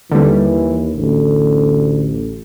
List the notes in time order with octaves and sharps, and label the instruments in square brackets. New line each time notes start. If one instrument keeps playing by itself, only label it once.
[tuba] D#2 [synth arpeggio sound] D3 G3 [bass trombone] E3
[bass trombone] A1 [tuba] D2